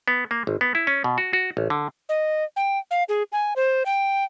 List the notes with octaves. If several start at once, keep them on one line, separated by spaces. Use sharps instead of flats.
B3
A#3
G#1
B3
E4
C#4
B2
F#4
F#4
A1
D3
D#5
G5
F5
G#4
G#5
C5
G5